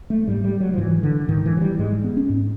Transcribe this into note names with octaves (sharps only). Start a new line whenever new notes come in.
A3
G#2 G3
G3
F#3
F3
G#2 E3
D3
G#2 D#3
E3
F#3
G3
G#2 G#3
B3
C#4
G#2